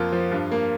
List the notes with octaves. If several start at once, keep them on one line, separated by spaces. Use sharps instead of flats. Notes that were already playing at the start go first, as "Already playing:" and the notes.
Already playing: F2 A#3 F4
F3
G2
A#3